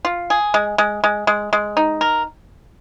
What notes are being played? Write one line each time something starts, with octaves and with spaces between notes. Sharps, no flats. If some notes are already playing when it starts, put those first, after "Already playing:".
F4
G#4
G#3
G#3
G#3
G#3
G#3
D#4
A#4